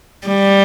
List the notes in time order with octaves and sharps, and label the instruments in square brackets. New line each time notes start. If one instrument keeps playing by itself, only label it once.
[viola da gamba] G3